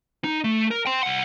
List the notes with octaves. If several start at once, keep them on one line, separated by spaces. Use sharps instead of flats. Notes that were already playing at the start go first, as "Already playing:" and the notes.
D#4
A3
A#4
G5 C6
C2 F#5